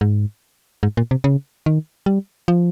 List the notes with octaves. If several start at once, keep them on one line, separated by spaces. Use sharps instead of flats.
G#2
G#2
A#2
C3
C#3
D#3
G3
F3